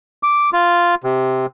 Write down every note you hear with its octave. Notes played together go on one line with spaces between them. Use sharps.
D6
F4
C3